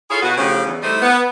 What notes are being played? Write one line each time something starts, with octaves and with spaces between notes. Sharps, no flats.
E4 F4 G#4 A4 C#5 F5
B2 F#4 B4
D2 C#3 F3 C#4 G4
E2
G3 A3 D#4 E4 C5 D#5
B3